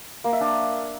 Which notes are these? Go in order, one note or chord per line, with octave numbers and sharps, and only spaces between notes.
A#3
E5
D4